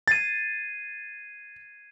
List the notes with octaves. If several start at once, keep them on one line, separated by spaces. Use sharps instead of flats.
G#6 A6 C7 D#7